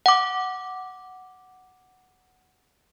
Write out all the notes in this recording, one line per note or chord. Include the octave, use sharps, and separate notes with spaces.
F#5 D6